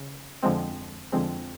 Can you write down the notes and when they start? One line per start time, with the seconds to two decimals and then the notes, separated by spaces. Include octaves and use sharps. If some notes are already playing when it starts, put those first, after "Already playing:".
Already playing: C#3
0.43 F2 D3 F3 G#3 C4
1.12 F2 D3 F3 G#3 C4